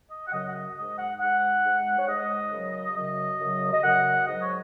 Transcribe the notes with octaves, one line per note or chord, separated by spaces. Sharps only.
D#5
F#5
F#2 C#3 F#3 D#5
F#5
D#5
G#3 D#5
G#2
F#5
G#2 G#3 F#5
G#2 G#3
C#5
G#2 G#3 D#5
F#2 C#3 F#3
F#2 C#3 F#3 D#5
F#2 C#3 F#3
D#5
F#2 C#3 F#3 F#5
G#2 F#3 D#5
C#5